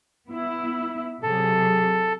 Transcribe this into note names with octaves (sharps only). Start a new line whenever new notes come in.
B3 E4
C3 F#3 G#4 A4